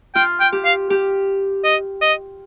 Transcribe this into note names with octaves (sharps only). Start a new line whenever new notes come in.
F4 G5
G5
G4
F5
G4
D#5
D#5